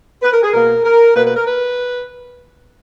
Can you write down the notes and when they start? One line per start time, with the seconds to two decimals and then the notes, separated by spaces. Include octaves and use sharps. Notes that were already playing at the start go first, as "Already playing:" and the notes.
0.22 B4
0.33 A#4
0.42 G#4
0.53 B2 A#3 A#4
0.84 A#4
1.15 B2 A#3 B4
1.26 B4
1.36 A#4
1.47 B4